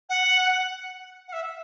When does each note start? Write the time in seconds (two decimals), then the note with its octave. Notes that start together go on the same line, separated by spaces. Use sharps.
0.09 F#5
1.27 F#5
1.32 E5